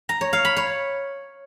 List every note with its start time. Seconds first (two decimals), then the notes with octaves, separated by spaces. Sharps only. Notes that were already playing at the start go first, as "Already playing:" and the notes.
0.09 A#5
0.21 C#5
0.33 F5
0.45 B5
0.56 C#5